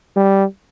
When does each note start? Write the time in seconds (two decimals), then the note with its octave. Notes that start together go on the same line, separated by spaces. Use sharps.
0.16 G3